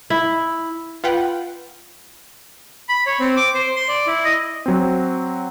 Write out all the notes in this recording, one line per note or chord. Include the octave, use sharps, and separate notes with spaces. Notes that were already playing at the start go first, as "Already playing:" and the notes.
E4
F4 B4 F#5 G5
B5
C#5
C4
D6
C5
C6
D5
E4
D#5
F#3 C4